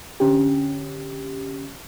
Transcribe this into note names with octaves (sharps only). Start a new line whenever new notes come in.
D3 C#4 G4